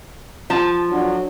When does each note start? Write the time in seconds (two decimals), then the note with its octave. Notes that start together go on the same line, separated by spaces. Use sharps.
0.50 F3 A5
0.90 D3 F#3 D4